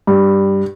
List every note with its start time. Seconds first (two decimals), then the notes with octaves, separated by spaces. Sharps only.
0.07 G2